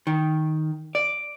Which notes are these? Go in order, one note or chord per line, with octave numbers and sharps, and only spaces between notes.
D#3
D5